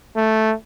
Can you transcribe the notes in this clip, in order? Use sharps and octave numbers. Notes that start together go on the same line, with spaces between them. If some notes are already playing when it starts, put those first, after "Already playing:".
A3